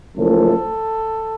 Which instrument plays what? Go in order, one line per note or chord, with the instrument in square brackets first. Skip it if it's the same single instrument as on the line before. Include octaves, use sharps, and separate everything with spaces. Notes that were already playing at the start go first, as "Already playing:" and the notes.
[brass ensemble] F#1 F#2 F3 A3 A4